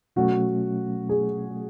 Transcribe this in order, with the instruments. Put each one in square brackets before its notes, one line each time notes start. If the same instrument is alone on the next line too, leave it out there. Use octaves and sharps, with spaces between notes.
[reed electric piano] B2 F#3 A3 C#4 [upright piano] F#4
[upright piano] G#4